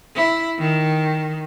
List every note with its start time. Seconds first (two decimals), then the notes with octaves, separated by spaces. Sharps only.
0.16 E4
0.59 D#3